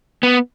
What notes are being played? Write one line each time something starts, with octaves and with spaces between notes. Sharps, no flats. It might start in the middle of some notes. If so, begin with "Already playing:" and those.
B3